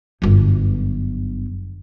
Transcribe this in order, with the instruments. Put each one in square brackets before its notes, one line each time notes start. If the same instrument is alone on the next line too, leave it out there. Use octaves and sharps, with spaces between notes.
[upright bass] G1 F#2